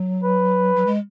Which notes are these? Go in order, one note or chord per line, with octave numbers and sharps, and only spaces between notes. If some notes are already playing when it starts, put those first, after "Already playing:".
Already playing: F#3
B4
F#3
G#3